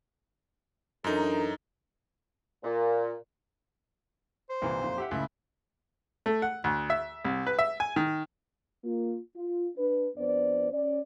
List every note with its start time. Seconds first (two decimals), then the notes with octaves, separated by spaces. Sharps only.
1.04 F#2 E3 D4 D#4 A4 A#4 A#5
2.64 A#2
4.50 C5
4.62 C2 A#2 E3
4.82 F2 A#2
4.98 G4 E5 F#5
5.11 C#2 A2 E4
6.26 A3
6.42 F#5
6.64 D2
6.90 E5
7.24 C2
7.47 B4
7.59 E5
7.80 G#5
7.96 D#3
8.84 A#3 F4
9.36 F4
9.77 D4 B4
10.17 F2 B3 D4 C5 D5
10.72 C#4 D5